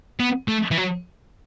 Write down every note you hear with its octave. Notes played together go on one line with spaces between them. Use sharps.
B3
A3
E3
F#3